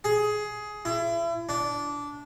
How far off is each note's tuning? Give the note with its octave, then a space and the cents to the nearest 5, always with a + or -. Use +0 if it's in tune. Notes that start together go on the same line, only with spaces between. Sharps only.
G#4 +15
E4 +35
D4 -15